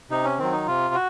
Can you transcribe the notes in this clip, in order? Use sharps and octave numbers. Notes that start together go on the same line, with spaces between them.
C3 D#4
C#4
D#3 F#3 C4
D#4
C3 F4
F#4